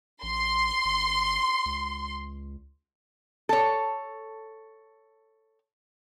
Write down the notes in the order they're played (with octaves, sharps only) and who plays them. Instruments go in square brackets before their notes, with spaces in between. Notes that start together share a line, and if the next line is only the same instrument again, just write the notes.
[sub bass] A1 [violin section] C6
[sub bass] G1
C#2
[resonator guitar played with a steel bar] A4 C#5